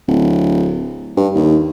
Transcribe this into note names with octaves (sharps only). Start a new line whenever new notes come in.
D1
G2
D#2